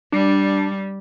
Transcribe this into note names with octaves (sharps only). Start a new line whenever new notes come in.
G3 D4